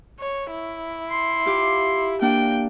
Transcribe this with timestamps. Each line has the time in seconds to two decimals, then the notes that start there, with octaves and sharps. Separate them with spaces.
0.20 C#5
0.51 E4
1.10 C6
1.46 F4 G4 D6
2.22 A#3 D4 G5